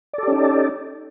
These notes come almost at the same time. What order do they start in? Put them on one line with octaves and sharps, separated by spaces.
D5 A4 G4 C#4 D#4